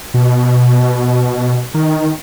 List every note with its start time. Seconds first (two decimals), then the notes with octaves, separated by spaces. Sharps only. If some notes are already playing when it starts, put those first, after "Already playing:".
0.14 B2
1.74 D#3